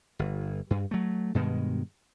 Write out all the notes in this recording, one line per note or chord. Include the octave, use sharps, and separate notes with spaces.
G1
G2
F#3 A3
G2 B2 D#3 G#3